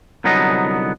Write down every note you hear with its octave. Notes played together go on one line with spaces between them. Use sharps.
C2 D3 F#3 B3 D#4 D#5